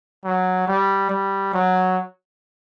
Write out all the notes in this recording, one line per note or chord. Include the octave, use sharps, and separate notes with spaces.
F#3
G3
G3
F#3